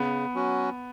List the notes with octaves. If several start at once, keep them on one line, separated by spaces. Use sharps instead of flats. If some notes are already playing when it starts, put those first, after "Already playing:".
Already playing: C#3 B3
F#3 C#4 F#4